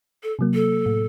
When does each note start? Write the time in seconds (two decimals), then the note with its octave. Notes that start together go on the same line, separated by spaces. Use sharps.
0.23 A4
0.39 C3 F#3 A#3
0.54 A4
0.86 A2